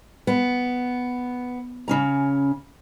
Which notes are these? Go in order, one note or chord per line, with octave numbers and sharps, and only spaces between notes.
B3
C#3 C#4 A#5